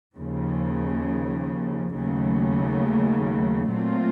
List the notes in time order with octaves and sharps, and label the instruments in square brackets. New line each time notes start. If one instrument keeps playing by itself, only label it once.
[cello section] D#2 C#3 F3
D#2 C#3 F#3 A3
A#2 F#3 A3 C4 F4